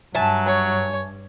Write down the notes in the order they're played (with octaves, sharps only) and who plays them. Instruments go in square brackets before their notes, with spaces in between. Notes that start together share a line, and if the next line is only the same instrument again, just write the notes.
[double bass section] G2 [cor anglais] F#3 [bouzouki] E5 G#5 A5
[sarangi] C#5